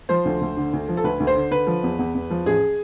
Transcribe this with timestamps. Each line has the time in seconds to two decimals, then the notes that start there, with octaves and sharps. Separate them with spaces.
0.09 F3 C5
0.25 D2
0.41 D2
0.57 D3
0.73 D2
0.88 F3
0.97 A4
1.04 D2 B4
1.20 D2
1.27 C5
1.36 D3
1.51 D3 B4
1.67 F3
1.83 E2
1.99 E2
2.15 E2
2.30 F3
2.46 A1 G#4